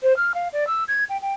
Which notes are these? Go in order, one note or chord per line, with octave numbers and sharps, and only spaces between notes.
C5
F6
F5
D5
E6
G#6
G5
G5